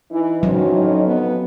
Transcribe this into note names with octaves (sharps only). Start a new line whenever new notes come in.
E3 D#4
F2 A2 F#3 C#4 D#4
B3